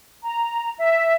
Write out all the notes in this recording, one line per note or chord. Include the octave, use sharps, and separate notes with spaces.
A#5
E5